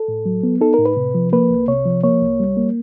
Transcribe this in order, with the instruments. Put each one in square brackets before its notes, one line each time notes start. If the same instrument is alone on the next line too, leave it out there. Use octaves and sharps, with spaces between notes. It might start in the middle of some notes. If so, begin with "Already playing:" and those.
Already playing: [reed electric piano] A4
A2
F#3
B3
D#4 A4
A2 A#4
B4
C3
F3
A#3 B4
C2
C3 C#5
F3
A#3 C#5
C2
G3
A#3